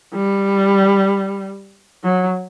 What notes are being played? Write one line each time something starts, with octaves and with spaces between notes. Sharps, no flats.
G3
F#3